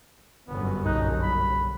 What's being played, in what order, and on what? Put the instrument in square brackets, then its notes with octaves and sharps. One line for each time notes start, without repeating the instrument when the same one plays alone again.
[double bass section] G1 F#2 [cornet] B3
[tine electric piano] B1 A#2 F#6 [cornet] D#4
[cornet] B5